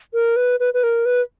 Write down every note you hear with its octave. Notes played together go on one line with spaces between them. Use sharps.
A#4
B4
B4
B4
A#4
B4